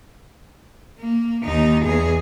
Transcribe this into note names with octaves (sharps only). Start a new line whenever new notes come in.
A#3
D#2 D#4
E2 G#4